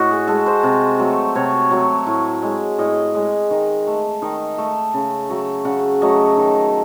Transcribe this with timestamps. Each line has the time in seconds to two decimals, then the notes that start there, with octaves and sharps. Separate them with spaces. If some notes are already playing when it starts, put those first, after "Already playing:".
Already playing: A2 F#4 D#5
0.10 G#4
0.27 G#3 A4
0.46 C5
0.63 C3
0.99 F#3 A3
1.35 C3 C#5
1.71 F#3 A3
2.07 A2
2.42 G#3
2.78 A2 D#5
3.15 G#3
3.51 D#3
3.87 A3
4.22 D#3 D#5
4.58 A3
4.94 C#3
5.30 F#3 A3
5.65 C#3 F#5
6.01 F#3 A3 D#5
6.37 D#3